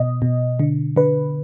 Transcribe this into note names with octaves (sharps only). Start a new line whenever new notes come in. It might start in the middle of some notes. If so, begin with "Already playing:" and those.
Already playing: B2 D#5
B2
D3
D3 B4